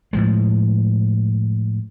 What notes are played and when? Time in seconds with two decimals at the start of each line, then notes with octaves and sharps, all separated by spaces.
0.13 A2 F3 G#3